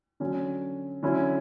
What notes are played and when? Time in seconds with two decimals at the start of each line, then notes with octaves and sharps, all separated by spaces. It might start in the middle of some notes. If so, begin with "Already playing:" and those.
0.20 D3 F#3 C#4
1.03 D3 F#3 C#4 E4